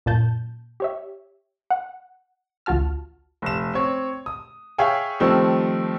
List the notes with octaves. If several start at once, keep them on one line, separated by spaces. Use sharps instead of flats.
F#2 A#2 A5 G6
G4 C#5 E5
F#5
A1 D2 F4 F#4 A5 F6
F1 E7
C4 C#5
D#6
G#4 C#5 E5 F5 G5 G#5
D#3 F3 G3 A3 C4 D#4